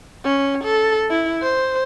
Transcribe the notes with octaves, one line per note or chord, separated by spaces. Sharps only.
C#4
A4
E4
C5